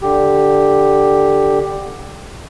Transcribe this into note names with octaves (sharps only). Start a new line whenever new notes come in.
D3 G4